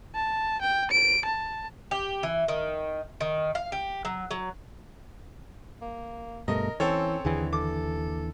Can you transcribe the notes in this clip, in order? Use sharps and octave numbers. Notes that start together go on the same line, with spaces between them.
A5
G5
D7
A5
G4
E3
D#3
D#3
F5
G4
F#3
F#3
A#3
G2 B2 A3 A#4 D#5
E3 C4 C#4 A4 C#5
D#2 D3 E3 G#4
A4 D6